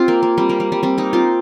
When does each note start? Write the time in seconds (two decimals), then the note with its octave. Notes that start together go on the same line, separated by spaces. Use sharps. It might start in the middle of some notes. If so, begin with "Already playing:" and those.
Already playing: C4 F4 G4
0.08 A#3
0.23 A#3
0.38 G3 C4
0.49 A#3
0.60 G3
0.72 G3
0.83 G3 C4
0.98 A#3 D#4
1.13 C4 F4